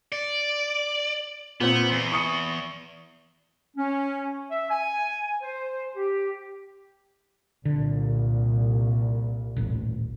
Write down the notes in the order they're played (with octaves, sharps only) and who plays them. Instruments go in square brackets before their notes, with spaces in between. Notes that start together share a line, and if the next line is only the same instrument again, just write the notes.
[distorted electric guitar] D5
[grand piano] A#2 C4 [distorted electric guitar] B3
[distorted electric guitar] E2
[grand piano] C#6 D#6 C#7
[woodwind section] C#4
E5
G#5
C5
G4
[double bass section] C2 A#2 [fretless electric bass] D3
[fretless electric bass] D#1 A1